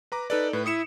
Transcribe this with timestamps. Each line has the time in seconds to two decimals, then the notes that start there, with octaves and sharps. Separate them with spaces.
0.12 B4 A#5 D6
0.30 D#4 A4 B4 D5
0.53 A2 B4
0.66 E4 D#6 C#7 E7